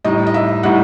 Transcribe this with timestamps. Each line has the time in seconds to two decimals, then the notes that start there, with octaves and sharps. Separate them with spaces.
0.04 A2 G3 D#4 D#5
0.27 D#5
0.34 E5
0.63 A2 G3 D#4 F#5